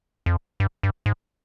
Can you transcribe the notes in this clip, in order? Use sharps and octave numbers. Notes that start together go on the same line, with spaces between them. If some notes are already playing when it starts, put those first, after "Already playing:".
F2
G2
G2
G#2